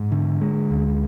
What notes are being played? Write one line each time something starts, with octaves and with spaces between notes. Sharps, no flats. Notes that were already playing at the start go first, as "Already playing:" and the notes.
Already playing: G#2
D3
G#3
D2